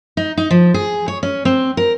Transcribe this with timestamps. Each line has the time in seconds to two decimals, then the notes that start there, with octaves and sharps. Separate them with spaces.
0.17 D#4
0.37 D#4
0.50 F3
0.74 G#4
1.08 C#5
1.23 C#4
1.45 C4
1.77 A#4